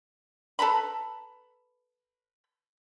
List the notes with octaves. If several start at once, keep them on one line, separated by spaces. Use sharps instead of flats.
A4 B4 A#5 B5